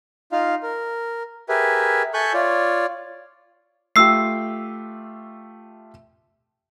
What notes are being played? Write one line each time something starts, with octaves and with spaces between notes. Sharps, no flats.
D#4 F4 F5
A#4
G4 G#4 A#4 B4 E5
A4 E5 G#5 C#6 F#6 G6
F4 C#5 D5
A3 F4 G4 E6 C7